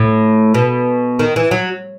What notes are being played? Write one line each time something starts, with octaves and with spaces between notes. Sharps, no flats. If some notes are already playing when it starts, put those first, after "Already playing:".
Already playing: A2
B2
D#3
E3
F#3